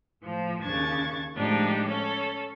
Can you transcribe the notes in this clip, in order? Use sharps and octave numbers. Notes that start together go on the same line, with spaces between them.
A2 F3
D#2 C#3 D4 C#6 G#6 A6
A2 F3 G#3 D4 D#4 G4
C#4 A4 C#5